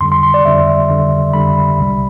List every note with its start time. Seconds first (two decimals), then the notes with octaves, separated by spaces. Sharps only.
0.01 F2 D3 G3 C6
0.12 C6
0.23 C6
0.34 D5
0.45 F2 D3 G3 E5
0.89 F2 D3 G3
1.33 F2 D3 G3 B5
1.78 C2 C3 G3